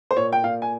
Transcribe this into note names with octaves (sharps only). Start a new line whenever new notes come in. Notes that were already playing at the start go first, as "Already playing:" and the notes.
C5
A#2 C#5
G5
A#2 F5
G#5